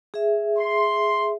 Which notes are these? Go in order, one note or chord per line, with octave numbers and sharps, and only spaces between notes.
G#4 E5
C6